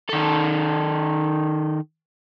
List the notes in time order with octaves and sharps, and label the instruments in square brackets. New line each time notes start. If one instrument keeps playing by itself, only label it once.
[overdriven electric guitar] D#3 A4